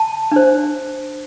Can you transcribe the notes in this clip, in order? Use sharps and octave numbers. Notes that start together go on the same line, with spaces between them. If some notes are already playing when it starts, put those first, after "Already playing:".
Already playing: A5
D4 C5